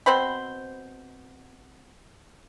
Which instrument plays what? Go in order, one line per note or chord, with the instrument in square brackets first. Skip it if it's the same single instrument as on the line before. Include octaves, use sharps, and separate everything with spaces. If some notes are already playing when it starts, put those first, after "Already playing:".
[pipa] B2 C4 C5 B5